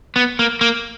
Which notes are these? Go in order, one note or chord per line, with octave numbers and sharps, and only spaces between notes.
B3
A#3
A#3